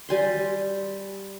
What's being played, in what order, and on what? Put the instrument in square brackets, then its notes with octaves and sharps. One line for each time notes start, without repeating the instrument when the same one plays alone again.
[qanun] G3 G#5 C6